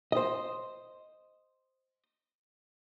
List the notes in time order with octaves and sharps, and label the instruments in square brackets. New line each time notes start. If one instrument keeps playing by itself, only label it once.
[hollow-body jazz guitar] C5 D#5